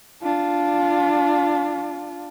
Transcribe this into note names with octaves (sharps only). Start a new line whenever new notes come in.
D4 F4